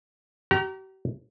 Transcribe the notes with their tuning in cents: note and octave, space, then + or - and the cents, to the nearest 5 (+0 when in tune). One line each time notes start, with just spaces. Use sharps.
G4 -45 A#5 +0